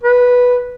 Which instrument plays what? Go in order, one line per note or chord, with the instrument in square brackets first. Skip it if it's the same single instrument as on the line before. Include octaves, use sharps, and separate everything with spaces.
[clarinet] B4